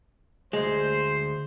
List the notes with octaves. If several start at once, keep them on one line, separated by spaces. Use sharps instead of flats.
D2 G#3 C5